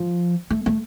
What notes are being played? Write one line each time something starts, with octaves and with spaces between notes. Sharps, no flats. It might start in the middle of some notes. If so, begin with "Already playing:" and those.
Already playing: F3
A3
A3